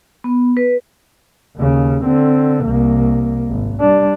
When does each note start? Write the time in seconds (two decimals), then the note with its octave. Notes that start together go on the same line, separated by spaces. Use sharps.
0.24 B3
0.57 B4
1.57 D#2 C#3
2.05 D3 C4
2.64 C2 A#3
3.48 G#1
3.80 G3 D4